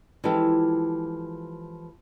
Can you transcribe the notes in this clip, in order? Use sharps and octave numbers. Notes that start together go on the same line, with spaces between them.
E3 F3 G#3 F4 G4 A4